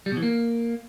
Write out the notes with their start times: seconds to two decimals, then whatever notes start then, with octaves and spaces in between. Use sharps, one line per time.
0.06 G3
0.12 B2
0.17 E3
0.23 A#3